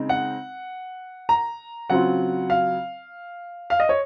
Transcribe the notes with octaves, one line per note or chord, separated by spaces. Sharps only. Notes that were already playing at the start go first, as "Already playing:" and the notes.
Already playing: C#3 G#3 C4 D#4
F#5
A#5
C#3 F#3 C4 F4 F#5
F5
F5
D#5
C#5